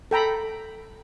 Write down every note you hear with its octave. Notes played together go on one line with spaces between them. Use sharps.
A4 G5 A#5 B5